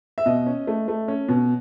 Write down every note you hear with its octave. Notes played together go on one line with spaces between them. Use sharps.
E5
B2 D#5
C#4
A3
A3
C#4
B2